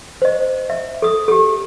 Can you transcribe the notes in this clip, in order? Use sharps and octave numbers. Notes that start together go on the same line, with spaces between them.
C5 D#5
E5
A4 D#6
G4 A4